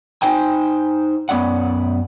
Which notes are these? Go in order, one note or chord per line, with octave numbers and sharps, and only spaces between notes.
D#4 C5 G5 G#5
F#2 B3 C#4 D5 F#5